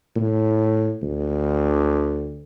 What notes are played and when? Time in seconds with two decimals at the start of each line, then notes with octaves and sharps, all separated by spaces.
0.16 A2
1.02 D2